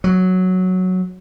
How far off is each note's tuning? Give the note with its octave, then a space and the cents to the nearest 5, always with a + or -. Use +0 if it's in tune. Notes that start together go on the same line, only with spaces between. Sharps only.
F#3 +0